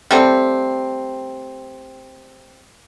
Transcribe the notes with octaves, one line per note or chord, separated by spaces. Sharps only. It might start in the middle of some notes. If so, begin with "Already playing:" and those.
G3 A3 C4